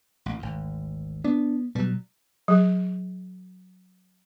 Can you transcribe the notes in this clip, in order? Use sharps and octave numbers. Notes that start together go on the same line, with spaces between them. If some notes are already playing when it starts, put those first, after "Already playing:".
A1
G#1 D2
B3 D4
B2 F#3 G3
F#3 G#4